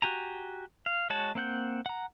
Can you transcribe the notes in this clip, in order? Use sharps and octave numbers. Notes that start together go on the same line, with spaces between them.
F#4 G4 G#5 A#5
F5
G#3 F#4 C#5 A5
A#3 C4 F#5 G6
F#5 A#5